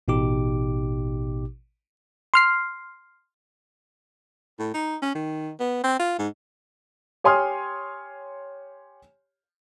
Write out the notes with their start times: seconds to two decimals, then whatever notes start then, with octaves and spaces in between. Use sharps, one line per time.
0.08 A1 B2 D#4 G4 D6
2.34 C6 F6 C7
4.59 A2
4.74 D#4
5.02 C#4
5.15 D#3
5.60 B3
5.84 C4
5.99 F4
6.19 G#2
7.24 G4 C#5 G#5 C6 D#6 F6